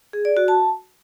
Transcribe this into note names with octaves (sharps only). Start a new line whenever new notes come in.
G#4
D5
F#4
A5